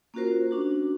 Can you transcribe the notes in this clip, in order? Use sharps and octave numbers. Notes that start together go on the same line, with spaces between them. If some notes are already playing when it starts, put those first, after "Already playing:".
A#3 C#4 F4 F#4 A#4 C5
C#4 D4 F#4